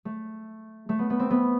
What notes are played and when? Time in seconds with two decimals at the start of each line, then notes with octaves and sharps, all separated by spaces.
0.05 A3
0.89 A3
0.99 B3
1.10 B3
1.19 C4
1.30 B3